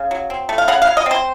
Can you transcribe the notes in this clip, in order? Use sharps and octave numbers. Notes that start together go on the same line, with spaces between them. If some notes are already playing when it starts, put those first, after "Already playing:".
Already playing: C#3 F5
F#3
C4
A3
F5
C#3 F#5
F5
F#3
D#5
C4 C5